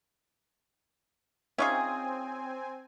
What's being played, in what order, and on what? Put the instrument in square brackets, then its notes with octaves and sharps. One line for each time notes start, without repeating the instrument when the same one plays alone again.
[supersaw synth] C4 G#5 [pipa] C#4 F4 G#4 [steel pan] D#4 C#5 E5